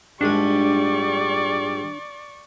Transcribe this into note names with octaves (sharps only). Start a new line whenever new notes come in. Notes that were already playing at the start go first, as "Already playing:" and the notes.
A#1 G#2 G3 D4 D5 G#5 C#6